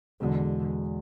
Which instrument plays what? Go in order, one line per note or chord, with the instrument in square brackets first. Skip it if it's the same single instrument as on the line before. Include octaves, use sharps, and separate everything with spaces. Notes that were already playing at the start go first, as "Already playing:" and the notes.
[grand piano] E2 B2 G#3 [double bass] D3